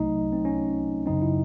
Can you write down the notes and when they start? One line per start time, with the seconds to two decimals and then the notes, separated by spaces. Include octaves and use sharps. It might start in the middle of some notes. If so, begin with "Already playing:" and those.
Already playing: C2 C3 F#3 A3 D#4
0.33 C4
0.45 C#4
1.06 G#1 F#2 C#3 F#3 C4 D#4
1.22 E4